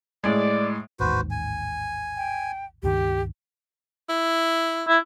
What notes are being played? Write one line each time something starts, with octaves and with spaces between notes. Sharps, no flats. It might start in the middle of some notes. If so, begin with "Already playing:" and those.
A2 G#3 D5
A1 D#2 G#2 F#4 B4 C5
G#5
G5
C#2 G2 D#3 G4
E4
E4